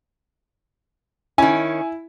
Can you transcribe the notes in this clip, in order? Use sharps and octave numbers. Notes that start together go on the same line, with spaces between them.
D#3 C#4 E4 G#5